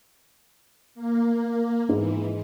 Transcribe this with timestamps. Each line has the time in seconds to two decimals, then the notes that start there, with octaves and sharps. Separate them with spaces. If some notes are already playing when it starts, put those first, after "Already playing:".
0.95 A#3
1.89 G#2 E3